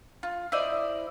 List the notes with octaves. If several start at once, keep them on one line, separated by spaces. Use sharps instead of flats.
F4
E4 C5 D5 D#5